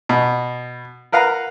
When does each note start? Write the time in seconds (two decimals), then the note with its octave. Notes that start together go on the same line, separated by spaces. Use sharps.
0.09 B2
1.12 A#4 B4 F5 F#5 A#5